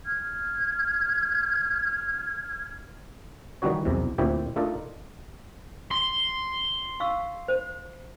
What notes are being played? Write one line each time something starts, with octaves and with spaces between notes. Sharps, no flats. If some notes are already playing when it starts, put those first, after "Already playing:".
F6 G#6
D#3 E3 G3 D#4 F#4 C#5
B1 E2 C3
D2 A#2 C4 E4 G4
A3 D4 D#4 F4 A4 A#4
C6
F5 C#6 E6
C5